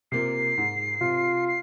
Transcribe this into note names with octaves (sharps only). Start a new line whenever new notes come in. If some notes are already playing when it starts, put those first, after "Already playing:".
C3 A#3 F4 C7
G#2
C3 F4
C7